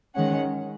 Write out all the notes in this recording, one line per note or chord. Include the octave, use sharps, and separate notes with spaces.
D#3 G#3 C#4 F#5